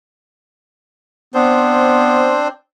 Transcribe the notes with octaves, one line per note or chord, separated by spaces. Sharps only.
B3 C4 D4 C5